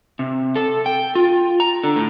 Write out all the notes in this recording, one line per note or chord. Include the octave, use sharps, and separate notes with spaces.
C3
A4
G5
F4
A#5
D3
A2